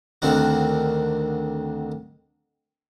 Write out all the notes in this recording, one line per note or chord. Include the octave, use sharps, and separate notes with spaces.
D2 D3 D#3 C4 F#4